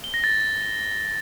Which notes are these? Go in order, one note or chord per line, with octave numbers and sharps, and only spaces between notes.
G7
A#6
A6